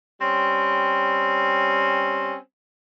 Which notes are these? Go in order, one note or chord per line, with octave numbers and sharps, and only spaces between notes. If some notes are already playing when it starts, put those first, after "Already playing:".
G3 C4 C#4